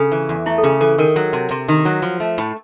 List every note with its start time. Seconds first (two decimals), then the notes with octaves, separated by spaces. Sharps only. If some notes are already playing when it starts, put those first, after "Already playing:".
Already playing: C#3 A4
0.12 E3
0.29 E2
0.46 A3 E4
0.58 A4
0.63 C#3 G#4
0.81 E3 A4
0.98 D#3 A#4
1.16 F#3
1.33 C3
1.51 C3
1.68 D#3
1.85 F#3
2.02 F3
2.20 A3
2.38 A2